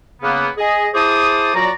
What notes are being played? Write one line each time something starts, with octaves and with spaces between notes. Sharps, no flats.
C#3 A#3 B3
G#4 D#5
E4 G#4 C5 A5 D6 D#6
A#2 F#3 F#4 D5 A#5